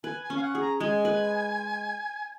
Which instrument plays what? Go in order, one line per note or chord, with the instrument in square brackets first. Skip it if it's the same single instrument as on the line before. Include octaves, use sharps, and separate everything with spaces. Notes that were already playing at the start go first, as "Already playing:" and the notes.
[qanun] B4 [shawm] G#5
[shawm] G#5
[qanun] C#4
[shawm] F5
F#5
[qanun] G#4
[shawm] A#5
[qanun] G#3 [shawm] G#5
[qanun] B4